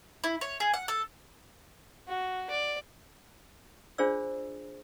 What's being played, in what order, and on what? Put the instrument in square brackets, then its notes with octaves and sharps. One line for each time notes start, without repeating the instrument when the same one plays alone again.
[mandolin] E4
C#5
G#4
F#5
A4
[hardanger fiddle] F#4
D5
[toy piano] D4 F4 G#4 C5 D5 E6